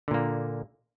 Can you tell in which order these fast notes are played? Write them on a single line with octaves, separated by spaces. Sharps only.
D3 A#2 A#3